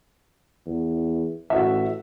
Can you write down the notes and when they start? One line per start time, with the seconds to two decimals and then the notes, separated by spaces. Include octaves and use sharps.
0.66 E2
1.50 A1 F#4 E5